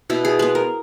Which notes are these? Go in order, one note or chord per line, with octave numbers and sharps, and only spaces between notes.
B2 E4
G#4
G#3 B3 B4
A#4